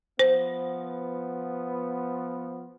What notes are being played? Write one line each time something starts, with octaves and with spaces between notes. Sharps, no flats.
F3 B3 C5